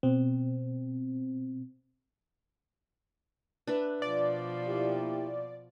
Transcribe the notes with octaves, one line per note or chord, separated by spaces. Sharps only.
B2 C4
D4 B4 E5
B2 F3 D5
A#3 E4 G4